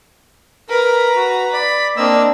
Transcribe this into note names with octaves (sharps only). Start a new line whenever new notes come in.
A#4 B4 A#5
F#4
D5 B5
A#3 C4 D4 D#5 E6